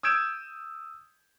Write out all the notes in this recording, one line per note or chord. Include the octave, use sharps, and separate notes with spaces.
D#6 E6 G6 G#6 D7 E7